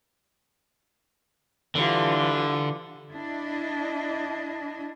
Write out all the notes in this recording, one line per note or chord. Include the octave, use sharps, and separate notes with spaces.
D3 E3 G3 F4
D4 E4 D#5